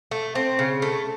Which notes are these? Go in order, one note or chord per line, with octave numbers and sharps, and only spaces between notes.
A3
C4
C#3
A3